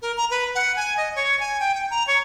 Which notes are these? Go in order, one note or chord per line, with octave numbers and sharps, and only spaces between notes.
A#4
A#5
B4
F#5
G#5
D#5
C#5
G#5
G5
G5
A#5
C#5